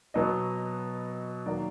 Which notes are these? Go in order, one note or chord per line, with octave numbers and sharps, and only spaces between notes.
B2 F#3 B3 D#5
D#3 F#3 A#3 D5